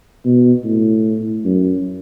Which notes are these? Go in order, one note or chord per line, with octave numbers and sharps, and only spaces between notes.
B2
A2
F#2